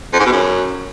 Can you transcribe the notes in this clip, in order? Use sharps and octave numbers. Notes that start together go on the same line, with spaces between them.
F2
G#2
B2
F#2